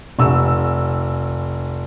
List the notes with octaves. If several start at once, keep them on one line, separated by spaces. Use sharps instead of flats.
F1 E6